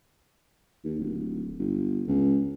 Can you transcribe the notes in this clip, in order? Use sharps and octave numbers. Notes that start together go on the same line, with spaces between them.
D#2
D1
G1
C#2